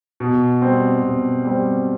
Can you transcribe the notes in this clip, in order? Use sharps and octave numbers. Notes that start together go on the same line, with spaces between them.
B2
G3 C4
B2
G3 C4